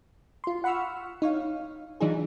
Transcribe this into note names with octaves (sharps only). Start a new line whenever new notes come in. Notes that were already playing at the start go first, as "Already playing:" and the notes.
F4 C6
F#5 B5 C#6 E6 F6
D#4 C#5 F5
E3 F#3 D4 D#4 F4 G#4